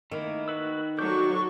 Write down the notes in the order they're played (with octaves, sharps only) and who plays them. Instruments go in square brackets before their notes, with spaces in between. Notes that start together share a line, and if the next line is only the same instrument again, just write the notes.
[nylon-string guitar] D#3 [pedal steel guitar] A3 A#3 E4
[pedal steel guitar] F#4 B4 E6
[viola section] F#3 A4 [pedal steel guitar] D5 D6 G6 [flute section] C#6